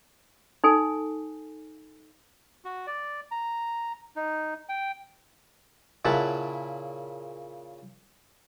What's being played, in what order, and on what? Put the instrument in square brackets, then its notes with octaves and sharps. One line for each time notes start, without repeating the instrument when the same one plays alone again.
[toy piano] D#4 A4 G#5
[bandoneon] F#4
D5
A#5
D#4
G5
[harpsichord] A#2 C#3 E4 F#5 A5